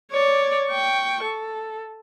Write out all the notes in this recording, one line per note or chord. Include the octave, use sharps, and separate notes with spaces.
C#5 D5
G5 C#6
A4